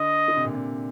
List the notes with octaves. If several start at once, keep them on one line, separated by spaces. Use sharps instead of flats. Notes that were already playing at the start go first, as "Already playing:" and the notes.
Already playing: D3 D#5
D3
C3
A#2
C3